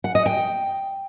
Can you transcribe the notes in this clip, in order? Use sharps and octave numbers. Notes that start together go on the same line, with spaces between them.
F#5
D#5
G5